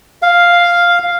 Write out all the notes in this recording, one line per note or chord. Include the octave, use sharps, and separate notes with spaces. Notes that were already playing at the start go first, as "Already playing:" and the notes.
F5